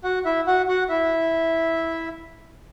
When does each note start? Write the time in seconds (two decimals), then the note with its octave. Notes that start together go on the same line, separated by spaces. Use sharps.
0.04 F#4 F#5
0.25 E4 E5
0.47 F#4 F#5
0.68 F#4 F#5
0.89 E4 E5